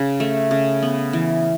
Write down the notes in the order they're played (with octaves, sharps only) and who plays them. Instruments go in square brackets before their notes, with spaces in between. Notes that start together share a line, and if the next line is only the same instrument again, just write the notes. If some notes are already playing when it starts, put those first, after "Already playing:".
Already playing: [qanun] C#3
A3
C#3
B3
E3